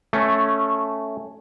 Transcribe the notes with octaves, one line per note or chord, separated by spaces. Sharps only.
A3 C#4